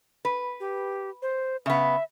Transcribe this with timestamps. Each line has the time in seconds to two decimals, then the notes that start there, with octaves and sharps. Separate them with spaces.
0.25 B4
0.60 G4
1.22 C5
1.66 C#3 B3 E5